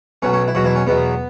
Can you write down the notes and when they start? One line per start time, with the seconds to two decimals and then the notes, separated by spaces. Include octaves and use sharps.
0.22 B1 B2 F#3 C#4
0.33 C#4
0.48 E4
0.55 E2 B2 F#3 F#4
0.65 E3 E4
0.76 C#4
0.86 E2 B2 F#3 B3